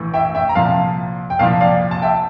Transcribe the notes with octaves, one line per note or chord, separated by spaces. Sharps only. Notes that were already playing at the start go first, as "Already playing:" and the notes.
Already playing: A#1 A2 E3
E5 G5
E5 G5
A#5
C2 A#2 F3 F5 A5
G5
C2 A#2 F3 F5 A5
D5 F5
A5
E5 G5